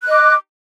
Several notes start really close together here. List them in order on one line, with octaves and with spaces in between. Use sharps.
F#6 D#5 D6